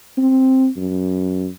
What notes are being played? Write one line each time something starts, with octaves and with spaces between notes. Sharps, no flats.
C4
F#2